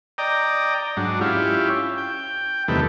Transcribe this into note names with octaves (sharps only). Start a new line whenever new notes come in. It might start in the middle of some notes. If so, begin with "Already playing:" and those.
D5 D#5 G5 A#5
G#2 F#3 D4
C#4 E4 F4 G4
G5
E2 C3 D#3 G3 A3 B4